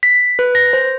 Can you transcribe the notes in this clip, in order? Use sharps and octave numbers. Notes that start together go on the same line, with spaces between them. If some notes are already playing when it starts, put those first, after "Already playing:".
B6
B4
A#6
C5